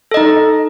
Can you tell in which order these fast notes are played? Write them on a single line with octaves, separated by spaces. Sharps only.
A4 D#5 D#4